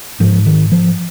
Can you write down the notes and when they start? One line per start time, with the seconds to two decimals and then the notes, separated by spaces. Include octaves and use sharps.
0.20 G#2 F3
0.46 D#3
0.72 F3